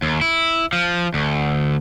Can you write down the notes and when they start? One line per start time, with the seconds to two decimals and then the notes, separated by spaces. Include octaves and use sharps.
0.02 D#2
0.22 E4
0.73 F3
1.14 D2